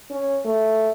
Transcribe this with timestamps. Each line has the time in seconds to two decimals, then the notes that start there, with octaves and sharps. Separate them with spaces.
0.10 C#4
0.45 A3